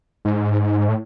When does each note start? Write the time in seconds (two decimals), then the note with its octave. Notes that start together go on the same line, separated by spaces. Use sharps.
0.25 G#2
0.89 A2